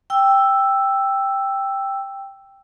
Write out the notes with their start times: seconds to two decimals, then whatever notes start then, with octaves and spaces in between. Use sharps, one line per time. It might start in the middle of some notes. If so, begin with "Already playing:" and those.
0.10 G5 E6